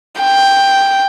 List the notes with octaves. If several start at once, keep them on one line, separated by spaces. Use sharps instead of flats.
G5